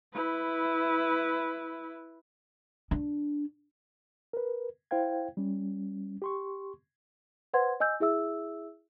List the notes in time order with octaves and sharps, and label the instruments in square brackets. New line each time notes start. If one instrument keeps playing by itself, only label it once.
[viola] E4 B4
[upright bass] D4
[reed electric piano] A#4 B4
E4 C5 F5 G5 G#6
G3 C#4
G4 C6 C#6
[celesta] B4 C5 F#5 C6 G#6
D#5 G#5 E6 G6
E4 G#4 E5 E6